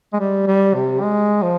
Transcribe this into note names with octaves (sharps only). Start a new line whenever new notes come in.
G#3
G3
G3
C3
G#3
F3